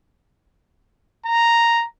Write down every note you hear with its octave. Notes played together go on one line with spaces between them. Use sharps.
A#5